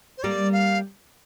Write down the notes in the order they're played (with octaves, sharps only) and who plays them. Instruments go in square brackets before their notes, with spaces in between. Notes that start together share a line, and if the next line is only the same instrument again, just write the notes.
[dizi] C5
[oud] G3 A#3 [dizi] D5
[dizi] F5